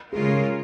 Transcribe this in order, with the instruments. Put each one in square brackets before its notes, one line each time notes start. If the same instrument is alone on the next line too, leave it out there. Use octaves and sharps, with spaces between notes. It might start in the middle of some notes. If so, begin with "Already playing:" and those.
[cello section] C#3 G#3 C#4 F4 A#4 [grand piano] G#4